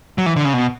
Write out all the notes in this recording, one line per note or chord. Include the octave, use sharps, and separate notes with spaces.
F#3
E3
D3
C#3
B2